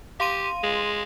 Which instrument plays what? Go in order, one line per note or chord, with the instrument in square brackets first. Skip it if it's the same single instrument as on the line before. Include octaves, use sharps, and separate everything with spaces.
[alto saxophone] G4 [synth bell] F5 C6 D#7
[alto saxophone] G#3